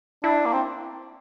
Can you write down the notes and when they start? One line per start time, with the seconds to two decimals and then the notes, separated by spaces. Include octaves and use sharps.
0.23 D4 E4
0.46 A#3
0.53 C4